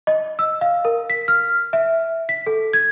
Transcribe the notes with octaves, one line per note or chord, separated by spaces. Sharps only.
D#5
E6
F5
A#4
B6
F6
E5
B6
A4
G#6